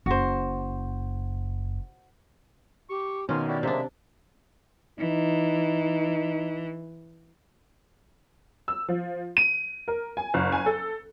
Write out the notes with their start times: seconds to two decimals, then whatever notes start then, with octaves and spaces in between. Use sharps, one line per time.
0.06 F#1 F#4 C5
2.89 G4 C#6
3.29 B2 D#3 A#3 C#4 G#5 C6
3.48 E4 F#4 G4 D5
3.63 C3 G#3 A#3 D4 E5
4.99 E3 D#4
8.68 E6
8.88 F3
9.37 D#7
9.88 A#4
10.17 G#5
10.34 F#1
10.52 G#5
10.66 A4